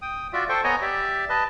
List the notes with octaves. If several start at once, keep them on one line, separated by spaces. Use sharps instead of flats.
G5 D#6
F4 F#4 D5 E5
A4 C5 G5 C#6
B3 C#5 D#5 G#5 A#5
G4 D5 E5
B4 D#5 A5